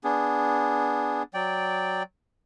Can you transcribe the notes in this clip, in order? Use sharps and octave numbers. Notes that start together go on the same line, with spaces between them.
B3 D4 G#4
F#3 D5 G5